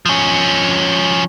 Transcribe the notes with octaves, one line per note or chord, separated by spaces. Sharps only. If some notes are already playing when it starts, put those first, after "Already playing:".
F3 C#4